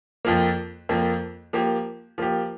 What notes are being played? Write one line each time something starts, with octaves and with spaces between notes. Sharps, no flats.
F2 F3 A#3
F2 F3 A#3
F3 A#3 G4
F3 A#3 G4